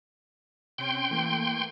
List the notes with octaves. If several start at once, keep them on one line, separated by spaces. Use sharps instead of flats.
C3 C4 C#4 G5 C6
E3 A3 A#3